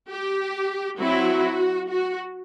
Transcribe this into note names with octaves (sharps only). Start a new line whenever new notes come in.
G4
F#3 C4 E4 F#4
F#4